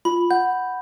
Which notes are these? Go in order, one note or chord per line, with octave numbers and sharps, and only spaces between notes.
F4 B5
F#5 G6